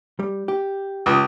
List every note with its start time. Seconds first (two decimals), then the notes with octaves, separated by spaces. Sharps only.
0.19 G3
0.48 G4
1.06 C#2